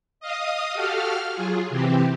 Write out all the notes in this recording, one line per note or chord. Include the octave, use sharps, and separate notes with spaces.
D#5 F5 D#6
F#4 G4 A4 F5 F6
F#3 F4 G#4
C3 E3 C4 G4